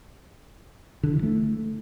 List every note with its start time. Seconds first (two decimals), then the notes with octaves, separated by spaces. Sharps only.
1.03 D3
1.13 E3
1.23 A3